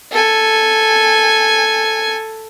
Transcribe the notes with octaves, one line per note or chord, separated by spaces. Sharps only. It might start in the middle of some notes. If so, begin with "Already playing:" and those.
A4 G#5